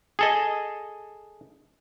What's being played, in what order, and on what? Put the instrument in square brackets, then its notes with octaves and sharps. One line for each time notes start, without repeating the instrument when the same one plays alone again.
[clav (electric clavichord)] G#4 A4 D#5